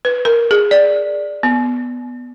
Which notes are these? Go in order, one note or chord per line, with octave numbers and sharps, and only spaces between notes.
B4
A#4
G#4
D5
B3